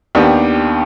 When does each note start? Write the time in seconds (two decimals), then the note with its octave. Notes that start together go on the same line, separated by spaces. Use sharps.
0.15 D#2 D#3 B3 D4 G4